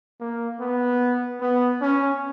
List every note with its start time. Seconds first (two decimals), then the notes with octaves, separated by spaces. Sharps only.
0.20 A#3
0.60 B3
1.41 B3
1.81 C#4